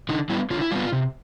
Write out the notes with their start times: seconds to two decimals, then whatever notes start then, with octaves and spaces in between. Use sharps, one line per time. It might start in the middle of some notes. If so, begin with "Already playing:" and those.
0.09 D3 D#4
0.30 G3 B3 E4
0.50 D3 F4
0.61 E4
0.71 G3 B3 F4
0.92 C3